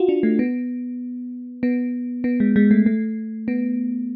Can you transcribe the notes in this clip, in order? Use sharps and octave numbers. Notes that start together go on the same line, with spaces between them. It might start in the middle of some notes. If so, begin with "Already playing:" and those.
Already playing: F4 F#4
D4
A3
B3
B3
B3
G#3
G#3
A3
A3
B3